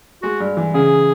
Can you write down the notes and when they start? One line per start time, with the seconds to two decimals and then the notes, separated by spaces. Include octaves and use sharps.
0.22 G#3 F#4
0.40 G2
0.57 E3
0.74 C#3 G#4